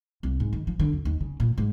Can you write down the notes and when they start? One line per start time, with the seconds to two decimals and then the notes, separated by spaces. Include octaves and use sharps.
0.23 C2
0.40 G#2
0.53 D#3
0.67 F3
0.80 D3
0.93 F2
1.05 D#2
1.20 C#3
1.40 A#2
1.58 G#2